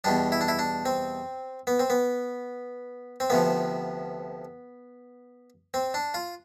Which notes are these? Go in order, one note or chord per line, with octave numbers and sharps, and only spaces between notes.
E2 B2 G3 D4
E4
D4
E4
D4
C4
B3
C4
B3
C4
D2 C3 F3 B3
C4
D4
F4